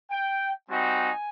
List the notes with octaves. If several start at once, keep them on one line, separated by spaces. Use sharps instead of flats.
G5
G3 C4 D#4 F#4 G#5